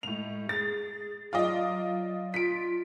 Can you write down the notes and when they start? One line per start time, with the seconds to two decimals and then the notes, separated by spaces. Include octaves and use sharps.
0.03 A2 G#3 F7
0.49 G#4 A6
1.33 F#3 F4 D5 D#5
2.34 F4 B6 D7